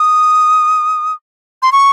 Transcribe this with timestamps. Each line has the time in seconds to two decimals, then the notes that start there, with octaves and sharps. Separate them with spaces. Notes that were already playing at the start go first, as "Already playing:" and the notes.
Already playing: D#6
1.62 C6
1.72 C#6